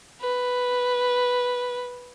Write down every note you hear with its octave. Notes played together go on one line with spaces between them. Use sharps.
B4